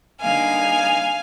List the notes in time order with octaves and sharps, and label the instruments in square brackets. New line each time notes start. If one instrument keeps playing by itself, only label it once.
[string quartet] D3 G3 A#3 D#4 F5 G#5